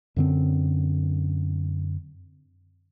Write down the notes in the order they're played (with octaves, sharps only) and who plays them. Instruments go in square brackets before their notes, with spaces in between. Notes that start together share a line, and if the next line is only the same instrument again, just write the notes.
[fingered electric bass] F#2 D3 C4